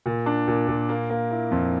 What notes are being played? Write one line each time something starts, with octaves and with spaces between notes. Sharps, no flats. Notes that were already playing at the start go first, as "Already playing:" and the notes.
A#2
D4
A#2
A#2
A#3
A#3
E4
F2